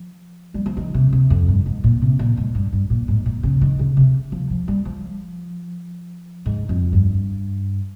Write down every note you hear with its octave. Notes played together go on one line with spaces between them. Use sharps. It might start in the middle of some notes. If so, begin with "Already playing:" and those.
Already playing: F3
G3
F3
D#3
C3
C3
F2
G2
G#2
A#2
C3
A#2
G#2
G2
G2
A#2
G#2
A#2
C#3
D#3
C#3
C3
F3
F3
G3
F3
G#2
F2
G2